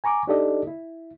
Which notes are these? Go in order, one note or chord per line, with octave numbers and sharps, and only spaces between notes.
G#5 A#5 C#6 D6
D4 D#4 G4 A4 D5 D#5
E4